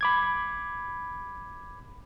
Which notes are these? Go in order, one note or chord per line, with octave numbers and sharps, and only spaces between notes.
B5 D6 G#6